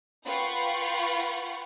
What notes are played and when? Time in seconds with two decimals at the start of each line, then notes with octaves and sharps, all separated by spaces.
0.25 F4 B4 F#5 G5 B5 C#6